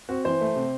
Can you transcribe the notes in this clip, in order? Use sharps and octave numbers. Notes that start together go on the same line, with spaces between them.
C4 F#4
E3 C5
A3
C3